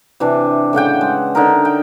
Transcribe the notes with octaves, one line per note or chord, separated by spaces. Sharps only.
C3 E3 D4
A2 C#3 F#5 G5
G#3
D3 D#4 A#4
G5